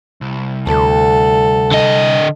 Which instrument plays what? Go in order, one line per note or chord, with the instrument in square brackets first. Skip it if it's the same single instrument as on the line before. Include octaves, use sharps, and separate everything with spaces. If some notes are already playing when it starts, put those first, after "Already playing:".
[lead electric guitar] C2
[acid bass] D2 [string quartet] A4
[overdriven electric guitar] D3 D#5